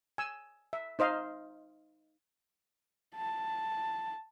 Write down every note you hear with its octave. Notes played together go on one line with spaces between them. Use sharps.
G#5 E6
E5
D#4 C5 D#5 F5
A5